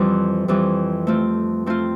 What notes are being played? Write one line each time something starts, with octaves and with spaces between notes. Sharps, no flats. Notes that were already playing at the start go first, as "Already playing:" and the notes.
Already playing: F2 E3 G3 C4
F2 E3 G3 C4
A3 C4 F4
A3 C4 F4